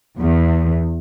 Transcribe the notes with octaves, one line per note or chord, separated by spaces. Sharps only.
E2